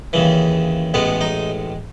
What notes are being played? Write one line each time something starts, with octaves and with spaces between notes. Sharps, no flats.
D#2 C#3 E3
A1 A2 G#3 B3
D#4